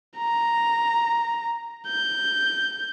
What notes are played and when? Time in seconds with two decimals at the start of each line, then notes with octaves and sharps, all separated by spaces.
0.18 A#5
1.87 G6